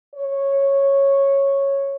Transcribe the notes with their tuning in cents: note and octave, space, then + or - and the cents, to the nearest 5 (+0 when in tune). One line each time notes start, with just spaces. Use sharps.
C#5 -10